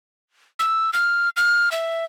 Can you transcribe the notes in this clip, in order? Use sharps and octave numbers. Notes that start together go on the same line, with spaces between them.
E6
F6
F6
E5